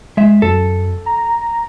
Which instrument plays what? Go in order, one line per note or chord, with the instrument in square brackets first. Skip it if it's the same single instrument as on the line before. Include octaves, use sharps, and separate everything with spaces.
[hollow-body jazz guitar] G#3 E5
[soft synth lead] F#2 [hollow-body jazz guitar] A4
[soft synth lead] A#5